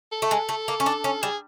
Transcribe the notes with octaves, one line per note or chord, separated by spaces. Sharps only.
A4
A3
G#3
A3
A#3
C#4
D4
C#4
G3 G#4